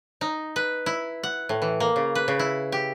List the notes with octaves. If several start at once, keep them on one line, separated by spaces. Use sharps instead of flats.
D#4
B4
E4
F#5
A2
E3
A#3
C#3
B4
C#3
E4
G4